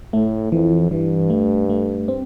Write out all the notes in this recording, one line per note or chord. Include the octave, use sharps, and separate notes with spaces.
A2 A3
F2 E3
G2 E3
A3
A3
C4